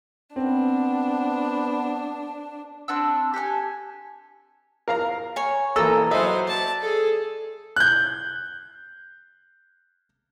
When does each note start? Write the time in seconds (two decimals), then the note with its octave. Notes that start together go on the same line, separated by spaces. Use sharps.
0.36 B3 C4 D4
2.88 C4 D4 F#5 E6
3.34 G4 A4 F#5 G#5
4.88 A#4 F5 A#5
5.36 C#5 G#5
5.76 E3 A#3 A4 D#5 A#5 E6
6.11 F#3 B4 C5 D#5 E5
6.47 D5 A5
6.81 G#4 A4
7.76 F#6 G6